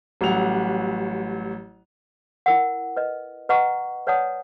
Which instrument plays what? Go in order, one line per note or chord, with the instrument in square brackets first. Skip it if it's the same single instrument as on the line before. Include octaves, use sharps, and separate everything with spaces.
[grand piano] A1 F#3 G3 F#5 F7
[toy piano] E4 A#4 F#5
B4 D#5
B4 D#5 F#5 A#5 C#6
B4 C#5 D5 F#5 A5 D#6